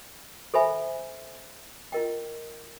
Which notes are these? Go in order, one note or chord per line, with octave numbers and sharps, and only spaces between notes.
A4 C5 E5 G#5 B5
F4 A#4 D#5 G5